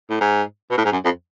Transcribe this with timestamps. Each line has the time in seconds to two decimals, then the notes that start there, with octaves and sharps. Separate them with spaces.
0.10 A2
0.21 G#2
0.70 B2
0.78 A2
0.85 G#2
0.92 F#2
1.04 F2